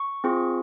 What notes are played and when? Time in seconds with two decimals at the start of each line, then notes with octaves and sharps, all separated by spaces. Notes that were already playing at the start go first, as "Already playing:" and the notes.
Already playing: C#6
0.24 C4 F4 G#4